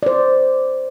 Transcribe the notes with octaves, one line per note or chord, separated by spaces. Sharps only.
C5 D5